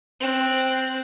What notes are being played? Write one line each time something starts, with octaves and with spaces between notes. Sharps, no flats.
C4 F#6